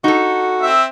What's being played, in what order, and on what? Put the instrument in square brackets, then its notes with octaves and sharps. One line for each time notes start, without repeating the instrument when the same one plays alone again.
[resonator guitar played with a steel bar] D#4 A4 [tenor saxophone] F#4
[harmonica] C4 E5